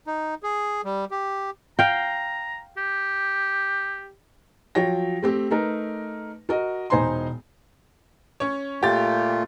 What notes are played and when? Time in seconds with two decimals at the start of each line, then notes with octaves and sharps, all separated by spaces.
0.07 D#4
0.43 G#4
0.84 G3
1.11 G4
1.79 F5 G5 A#5
2.77 G4
4.75 F3 F#3 C#5 G5 A#6
5.22 A3 C4 G4
5.51 A3 D#4 A#4 B4
6.49 F#4 A#4 D#5
6.90 E1 D#4 C5 G#5 A#5 C6
8.40 C#4 C#5
8.83 A#2 A3 F4 G4 A6